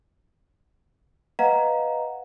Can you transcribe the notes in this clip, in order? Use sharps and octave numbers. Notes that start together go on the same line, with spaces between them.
B4 D#5 F5 F#5 A#5